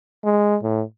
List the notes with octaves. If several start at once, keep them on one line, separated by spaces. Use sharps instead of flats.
G#3
A2